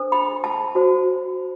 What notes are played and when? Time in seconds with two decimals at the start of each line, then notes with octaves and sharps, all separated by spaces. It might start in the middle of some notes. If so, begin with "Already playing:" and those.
Already playing: D4 A4 C5
0.12 B5
0.44 A5
0.75 F#4 C5